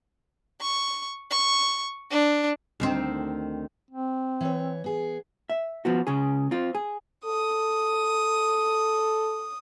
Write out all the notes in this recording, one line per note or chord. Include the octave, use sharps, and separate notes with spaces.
C#6
C#6
D4
D2 D#3 C4
C4
E3 C#5
B3 G#4
E5
F3 B3 F#4
C#2 C#3 G#4
C4 F4
G#4
A4 D#6